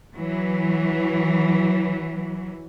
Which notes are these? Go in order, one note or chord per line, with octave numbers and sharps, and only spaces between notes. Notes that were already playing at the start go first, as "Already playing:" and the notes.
E3 F#3